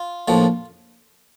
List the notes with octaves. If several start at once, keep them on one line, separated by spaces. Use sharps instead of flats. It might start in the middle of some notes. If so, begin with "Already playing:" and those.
Already playing: F4
A#1 A2 F3